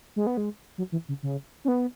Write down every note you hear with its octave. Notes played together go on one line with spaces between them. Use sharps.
G#3
B3
G#3
F#3
E3
C#3
C#3
C#4
B3